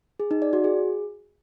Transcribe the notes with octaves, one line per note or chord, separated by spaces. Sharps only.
G#4
D#4
D5
F#4
G#4